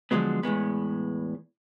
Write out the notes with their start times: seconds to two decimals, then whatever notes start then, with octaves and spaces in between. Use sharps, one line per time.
0.11 D3 F3 F#3 G#3 B3
0.43 E2 A2 G#3 B3